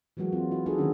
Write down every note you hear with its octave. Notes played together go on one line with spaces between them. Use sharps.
E3 F#3 G#3 A#3 F#4
C4 F4
E4 F#4
A#3 D#4 F#4 G#4 A4
D3 D#3 F3 A#3 C#4 D4